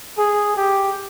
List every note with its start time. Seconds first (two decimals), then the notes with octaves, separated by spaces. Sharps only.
0.18 G#4
0.57 G4